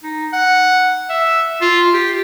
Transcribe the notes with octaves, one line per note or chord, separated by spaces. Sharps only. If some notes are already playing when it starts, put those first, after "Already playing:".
D#4
F#5
E5
F4
G4